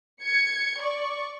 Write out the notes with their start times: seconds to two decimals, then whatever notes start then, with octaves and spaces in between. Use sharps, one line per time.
0.23 G#6 C#7
0.81 D5 C#6